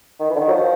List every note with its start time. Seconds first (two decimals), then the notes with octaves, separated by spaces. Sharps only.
0.20 D#3
0.30 E3
0.36 D3
0.41 D#3
0.47 F#3
0.51 F3